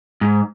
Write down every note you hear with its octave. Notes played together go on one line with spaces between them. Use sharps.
G#2